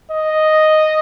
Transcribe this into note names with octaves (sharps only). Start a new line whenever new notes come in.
D#5